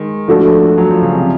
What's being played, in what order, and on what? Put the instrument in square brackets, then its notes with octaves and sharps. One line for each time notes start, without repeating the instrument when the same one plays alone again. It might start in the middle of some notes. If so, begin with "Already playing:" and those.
Already playing: [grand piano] D#3 G#3
[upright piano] F3 A3 D4 F#4 A4
[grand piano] F#3
F3
C#3
C3